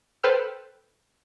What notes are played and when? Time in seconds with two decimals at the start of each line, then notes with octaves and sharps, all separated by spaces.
0.23 A4 B4 C5 G5 E6 F6